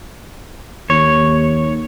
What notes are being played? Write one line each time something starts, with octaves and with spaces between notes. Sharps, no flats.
D#2 C#5